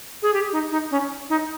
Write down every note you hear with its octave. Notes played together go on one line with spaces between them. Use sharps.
G#4
G4
D#4
D#4
C#4
D#4